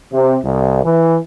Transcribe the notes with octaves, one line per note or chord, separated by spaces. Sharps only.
C3
C2
E3